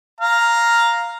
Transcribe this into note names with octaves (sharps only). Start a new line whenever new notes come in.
F5 A#5